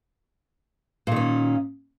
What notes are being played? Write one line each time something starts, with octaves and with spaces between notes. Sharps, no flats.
A#2 D#3 C#4